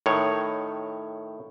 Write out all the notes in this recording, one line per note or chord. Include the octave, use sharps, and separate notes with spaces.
A2 D#3 C#5